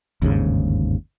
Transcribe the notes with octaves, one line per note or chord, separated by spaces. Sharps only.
G1 D#2 G#2 C#3